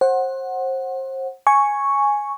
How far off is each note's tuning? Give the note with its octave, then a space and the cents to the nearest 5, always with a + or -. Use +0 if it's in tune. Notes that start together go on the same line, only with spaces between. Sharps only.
C5 +30 F#5 +0
G#5 +0 C#6 +0